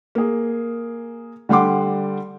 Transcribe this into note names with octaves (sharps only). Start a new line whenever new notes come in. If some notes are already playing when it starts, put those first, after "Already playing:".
A#3 G#4
D3 G3 F#5 C6 D6